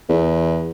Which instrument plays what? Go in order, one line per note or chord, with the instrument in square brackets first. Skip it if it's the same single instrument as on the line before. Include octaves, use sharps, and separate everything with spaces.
[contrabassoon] E2